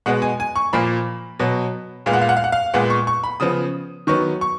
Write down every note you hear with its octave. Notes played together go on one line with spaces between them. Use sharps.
B2 G#3 B3 F#5
G#5
G#5
C#6
A#2 F3 A#3 B5
B2 F#3 B3
A#2 G#3 B3 F5
F#5
F5
F#5
F5
F#5
F5
A#2 G#3 B3 F#5
C#6
C#6
B5
C#3 F3 B3 D#6
D#3 F#3 B3 C#6
C#6